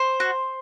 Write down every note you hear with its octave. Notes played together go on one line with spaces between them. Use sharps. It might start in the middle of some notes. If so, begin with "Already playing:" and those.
Already playing: C5
F#4